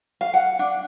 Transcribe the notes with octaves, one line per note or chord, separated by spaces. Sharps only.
F5
F#5
D4